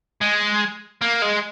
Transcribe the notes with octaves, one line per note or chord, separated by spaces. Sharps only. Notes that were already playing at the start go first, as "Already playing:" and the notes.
G#3
A#3
G#3